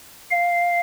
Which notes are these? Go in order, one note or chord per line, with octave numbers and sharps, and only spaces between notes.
F5